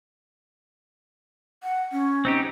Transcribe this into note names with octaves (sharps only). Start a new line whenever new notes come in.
F#5
C#4
C4 D#4 G4